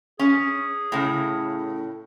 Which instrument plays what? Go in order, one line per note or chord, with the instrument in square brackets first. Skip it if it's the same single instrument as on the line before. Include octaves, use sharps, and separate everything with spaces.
[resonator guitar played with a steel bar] C#4 [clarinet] G#4
[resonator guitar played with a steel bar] A2 C#3